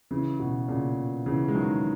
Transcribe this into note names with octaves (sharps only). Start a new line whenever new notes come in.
C#3 E3
B2
A#2 C#3
C#3 E3
G#3
D#3 F#3